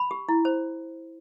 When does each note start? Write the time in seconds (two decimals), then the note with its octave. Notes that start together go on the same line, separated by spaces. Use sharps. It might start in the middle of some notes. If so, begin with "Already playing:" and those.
Already playing: B5
0.11 G4
0.29 E4
0.45 C5